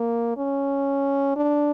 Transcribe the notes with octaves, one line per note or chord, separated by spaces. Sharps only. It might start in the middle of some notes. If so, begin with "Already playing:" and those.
Already playing: A#3
C#4
D4